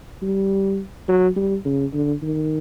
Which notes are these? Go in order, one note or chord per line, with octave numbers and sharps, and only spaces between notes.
G3
F#3
G3
C#3
D3
D#3